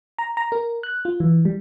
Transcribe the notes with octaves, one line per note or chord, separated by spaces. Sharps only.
A#5
A#5
A#4
F#6
F4
E3
G3